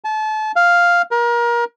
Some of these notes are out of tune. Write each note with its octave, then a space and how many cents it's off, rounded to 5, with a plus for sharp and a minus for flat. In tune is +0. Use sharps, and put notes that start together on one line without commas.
A5 -30
F5 +0
A#4 +30